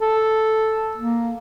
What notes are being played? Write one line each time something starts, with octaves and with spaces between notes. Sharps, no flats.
A4
A#3